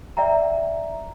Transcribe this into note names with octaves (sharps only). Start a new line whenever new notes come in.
D5 E5 G5 A#5